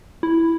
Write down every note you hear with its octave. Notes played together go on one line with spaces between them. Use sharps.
E4